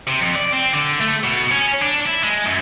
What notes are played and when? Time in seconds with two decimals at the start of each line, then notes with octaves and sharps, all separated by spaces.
0.08 C3
0.21 F2
0.36 D5
0.53 C4
0.74 D3
1.01 A3
1.24 B2
1.52 C#4
1.82 D4
2.06 E4
2.23 G#3
2.47 F#2